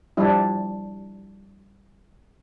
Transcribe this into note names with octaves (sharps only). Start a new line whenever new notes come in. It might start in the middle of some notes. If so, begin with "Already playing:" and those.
F3 G3 D4 E4